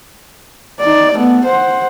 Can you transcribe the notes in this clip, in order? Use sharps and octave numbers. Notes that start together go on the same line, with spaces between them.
D#4 D5
A3 B3
C5 F#5